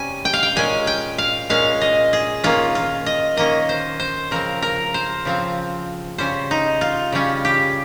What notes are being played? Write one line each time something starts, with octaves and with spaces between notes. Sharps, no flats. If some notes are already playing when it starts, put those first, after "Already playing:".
Already playing: C3 G3 C#4 G#5
G5
F5
G5
A#2 G#3 C#4 G#5
G5
F5
A#2 G#3 C#4 F5
D#5
G#4
D#3 A#3 C#4 F4
F4
D#5
D#3 A#3 C#4 D#5
C5
C5
C#3 F3 C4 A#4
A#4
C5
C#3 F3 C4
C#3 G3 C#4 C5
D#4
F4
C#3 G3 C#4
G4